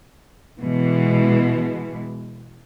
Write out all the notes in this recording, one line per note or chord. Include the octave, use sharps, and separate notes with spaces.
B2 E3 G#3